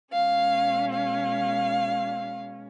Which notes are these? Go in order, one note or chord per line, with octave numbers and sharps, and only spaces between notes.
B2 G#3 C#4 F5
F5